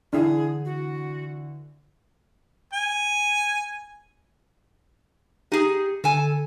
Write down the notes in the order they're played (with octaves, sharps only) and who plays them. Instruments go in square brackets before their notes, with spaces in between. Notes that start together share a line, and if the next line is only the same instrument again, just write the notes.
[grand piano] D3 E3 [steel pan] D4 E4 [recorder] G#4
[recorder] F#4
[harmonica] G#5
[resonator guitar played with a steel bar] D#4 G#4 [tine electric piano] G4
[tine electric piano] D3 [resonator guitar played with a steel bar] A4 G#5